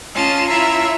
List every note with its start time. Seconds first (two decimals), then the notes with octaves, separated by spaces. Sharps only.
0.14 C#4 F4 D#5 A5
0.48 E4 F4 C#5 E5 A#5